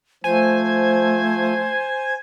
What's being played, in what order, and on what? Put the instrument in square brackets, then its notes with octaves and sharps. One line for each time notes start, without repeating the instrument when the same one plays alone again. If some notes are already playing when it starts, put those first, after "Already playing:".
[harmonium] F3 [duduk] A3 [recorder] C5 [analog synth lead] G#5